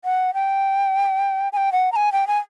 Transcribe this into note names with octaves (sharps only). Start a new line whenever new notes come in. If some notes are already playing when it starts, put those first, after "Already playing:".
F#5
G5
G#5
G5
F#5
A#5
G#5
G5
G#5